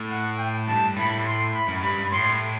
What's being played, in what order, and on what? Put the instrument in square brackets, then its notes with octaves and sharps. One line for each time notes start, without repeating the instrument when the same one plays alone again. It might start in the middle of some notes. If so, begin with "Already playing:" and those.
Already playing: [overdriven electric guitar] A2
[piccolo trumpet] F#5
G5
[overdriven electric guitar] G2 [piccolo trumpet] A5
[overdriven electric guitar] A2 [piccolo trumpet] B5
[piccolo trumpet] C6
B5
[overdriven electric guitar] F#2
[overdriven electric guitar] G2 [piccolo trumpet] B5
[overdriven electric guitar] A2 [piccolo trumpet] C6